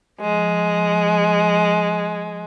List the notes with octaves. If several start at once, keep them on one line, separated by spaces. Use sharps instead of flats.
F3 G#3